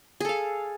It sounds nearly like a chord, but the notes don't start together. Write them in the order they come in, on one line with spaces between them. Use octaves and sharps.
G#4 A4 F5